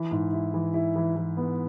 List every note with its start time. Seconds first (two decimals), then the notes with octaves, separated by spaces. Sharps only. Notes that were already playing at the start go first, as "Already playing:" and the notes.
Already playing: E3
0.11 G#2
0.33 E4
0.54 E3
0.74 E4
0.96 E3
1.16 E3
1.37 B3